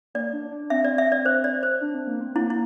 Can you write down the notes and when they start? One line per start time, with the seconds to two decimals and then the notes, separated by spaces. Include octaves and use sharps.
0.14 A#3 D5
0.33 D4
0.51 D4
0.70 C4 E5
0.84 D5
0.98 E5
1.12 D5
1.25 C5
1.44 D5
1.63 C5
1.81 D4
1.94 C4
2.07 A#3
2.21 C4
2.36 A#3 E4
2.50 E4